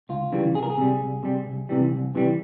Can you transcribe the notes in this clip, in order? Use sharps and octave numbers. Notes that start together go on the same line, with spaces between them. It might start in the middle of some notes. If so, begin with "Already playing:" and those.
C#2 F4
C#3 E3 G3
C2 G#4
A#4
G#4
C3 G3
C2
C3 G3
C2
C3 E3 G3
C2
C3 E3 G3